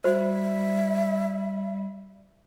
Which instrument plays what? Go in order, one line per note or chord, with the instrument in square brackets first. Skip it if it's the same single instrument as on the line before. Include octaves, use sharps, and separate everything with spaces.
[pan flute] G3 [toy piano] F#4 C5 [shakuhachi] E5